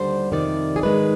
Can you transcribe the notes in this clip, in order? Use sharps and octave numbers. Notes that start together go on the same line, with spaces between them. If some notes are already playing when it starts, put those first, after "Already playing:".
Already playing: D#2 D3 G3 C5
F2 C3 D#3 G3 D5
G#4
G#2 D#3 G#3 B4